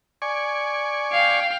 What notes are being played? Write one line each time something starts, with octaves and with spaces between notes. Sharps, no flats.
D5 G#5 C#6
F5 G5